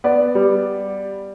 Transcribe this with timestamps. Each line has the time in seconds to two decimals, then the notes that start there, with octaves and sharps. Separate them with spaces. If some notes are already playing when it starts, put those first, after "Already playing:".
0.04 B3 D5
0.35 G3